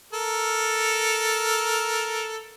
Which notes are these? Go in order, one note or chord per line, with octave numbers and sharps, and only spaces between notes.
A4 A#4